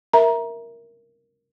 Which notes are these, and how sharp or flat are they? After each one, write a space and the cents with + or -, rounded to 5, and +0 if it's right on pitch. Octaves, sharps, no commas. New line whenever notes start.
A#4 +0 E5 -5 A#5 +20